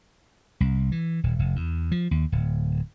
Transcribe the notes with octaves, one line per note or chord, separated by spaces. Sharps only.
C2
E3
D#1
F1
E2
F3
D#2
D1